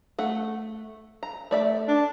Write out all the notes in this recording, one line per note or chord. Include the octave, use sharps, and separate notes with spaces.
A3 F#5
A#5
A3 D5 E5
D4